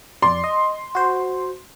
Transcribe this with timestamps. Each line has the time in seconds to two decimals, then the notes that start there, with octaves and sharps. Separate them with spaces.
0.22 F2 D5 C6
0.44 D#5
0.95 F#4 C5